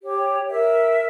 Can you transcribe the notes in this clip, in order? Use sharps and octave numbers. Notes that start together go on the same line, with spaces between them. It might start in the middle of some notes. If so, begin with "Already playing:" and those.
G4 C#5
A#4 E5